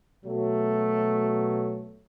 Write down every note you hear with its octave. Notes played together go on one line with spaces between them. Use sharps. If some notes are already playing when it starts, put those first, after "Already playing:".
B2 F#3 A3